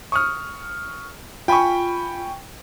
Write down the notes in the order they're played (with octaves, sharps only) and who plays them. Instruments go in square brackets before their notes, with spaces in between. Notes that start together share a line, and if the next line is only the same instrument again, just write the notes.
[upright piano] C#6 D#6 F6
[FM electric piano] F4 B5 [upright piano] G5 G#5 C#6